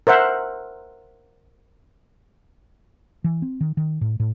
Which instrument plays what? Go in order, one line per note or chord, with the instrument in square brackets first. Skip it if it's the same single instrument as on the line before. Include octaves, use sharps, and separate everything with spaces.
[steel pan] A#4 C5 E5 F#5
[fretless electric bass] E3
C4
D#3
D#3
A2
A2